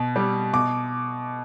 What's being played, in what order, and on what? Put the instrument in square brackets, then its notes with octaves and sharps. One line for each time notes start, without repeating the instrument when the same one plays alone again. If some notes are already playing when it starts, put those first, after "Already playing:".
Already playing: [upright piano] B2
G3
B2 D6